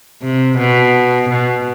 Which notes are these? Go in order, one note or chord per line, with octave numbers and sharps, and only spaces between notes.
C3
B2
B2